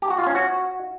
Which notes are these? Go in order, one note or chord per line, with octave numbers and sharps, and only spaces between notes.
G4
F#4
F4
C#4
F#4